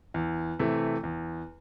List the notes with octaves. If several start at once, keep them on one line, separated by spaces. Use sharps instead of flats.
E2
C3 E3 A3
E2